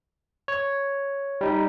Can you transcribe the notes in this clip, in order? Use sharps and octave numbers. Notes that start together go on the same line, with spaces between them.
C#5
G3 D#4